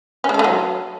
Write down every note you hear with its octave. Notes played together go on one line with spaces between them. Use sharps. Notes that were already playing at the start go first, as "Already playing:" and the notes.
C#4
G#3
A4
A3
F#3